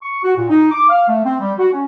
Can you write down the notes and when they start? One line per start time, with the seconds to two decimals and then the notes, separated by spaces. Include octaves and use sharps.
0.02 C#6
0.24 F#4
0.36 A#2
0.49 D#4
0.71 D6
0.89 F5
1.08 A3
1.24 C4
1.40 G3
1.59 F#4
1.72 C#4